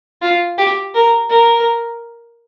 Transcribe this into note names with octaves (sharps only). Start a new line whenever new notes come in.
F4
G4
A#4
A#4